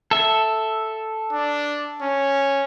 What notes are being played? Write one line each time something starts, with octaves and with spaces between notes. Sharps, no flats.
A4 E5
D4
C#4